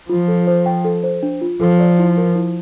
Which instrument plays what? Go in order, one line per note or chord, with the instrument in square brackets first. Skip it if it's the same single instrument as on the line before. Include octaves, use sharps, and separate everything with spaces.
[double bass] F3 [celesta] F4
[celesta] A4
C5
G5
A4
C5
D4
F4
[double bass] F3 [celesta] A4
[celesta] D5
E4
A#4
E4